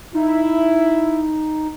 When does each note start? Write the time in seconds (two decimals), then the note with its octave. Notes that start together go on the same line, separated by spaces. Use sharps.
0.14 D#4 E4